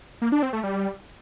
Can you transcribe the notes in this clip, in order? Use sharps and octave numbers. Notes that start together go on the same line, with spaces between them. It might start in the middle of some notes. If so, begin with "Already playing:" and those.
A#3
D4
C4
A3
G3